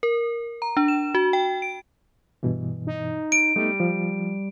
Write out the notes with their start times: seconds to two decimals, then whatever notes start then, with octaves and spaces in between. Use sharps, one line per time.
0.03 A#4
0.62 A#5
0.77 D4
0.88 E7
1.15 F#4
1.33 G5
1.62 D7
2.43 G2 B2 E3
2.87 D#4
3.32 D7
3.56 G3 A3 B3 D#4
3.80 F3